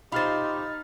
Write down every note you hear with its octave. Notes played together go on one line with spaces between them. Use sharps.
D#4 F4 G4 C5 B5 F6 A6